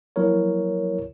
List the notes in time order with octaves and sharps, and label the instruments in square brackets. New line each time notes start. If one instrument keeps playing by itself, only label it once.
[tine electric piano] F3 F#3 A#3 E4 A#4 C#5